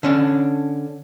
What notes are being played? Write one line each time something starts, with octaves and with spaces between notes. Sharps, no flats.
D3 C#4 D4